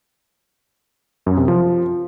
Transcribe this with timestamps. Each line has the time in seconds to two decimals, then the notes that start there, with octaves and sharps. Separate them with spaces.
1.26 F#2
1.37 C3
1.48 F3